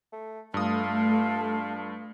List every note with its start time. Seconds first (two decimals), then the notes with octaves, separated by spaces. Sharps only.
0.12 A3
0.54 G2 A3 F4 A4 D#6